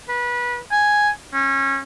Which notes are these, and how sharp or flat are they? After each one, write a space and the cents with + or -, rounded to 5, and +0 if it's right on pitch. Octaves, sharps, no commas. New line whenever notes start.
B4 -25
G#5 +0
C#4 -25